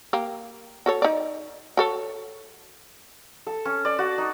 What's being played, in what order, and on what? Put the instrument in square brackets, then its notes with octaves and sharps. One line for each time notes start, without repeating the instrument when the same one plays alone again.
[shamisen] A#3 G4
F#4 A4 C#5
D#4 D5
F#4 A4 C#5
[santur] A4
C#4
D5
F#4
D#4